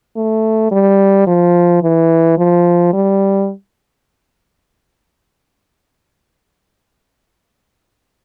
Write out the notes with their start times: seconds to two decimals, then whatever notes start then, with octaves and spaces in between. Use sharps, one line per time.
0.16 A3
0.72 G3
1.27 F3
1.83 E3
2.38 F3
2.93 G3